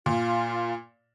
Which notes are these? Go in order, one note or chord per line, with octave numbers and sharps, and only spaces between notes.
A#2 F4